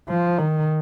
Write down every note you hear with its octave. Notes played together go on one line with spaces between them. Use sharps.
F3
D#3